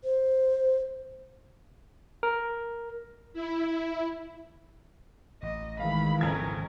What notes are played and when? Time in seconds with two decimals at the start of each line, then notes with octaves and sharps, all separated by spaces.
0.04 C5
2.23 A#4
3.33 E4
5.43 A1 D#5
5.80 D#3 E3 G#3 F5 B5
6.21 D1 G#1 F2 C#3 C#4 A#4 G#6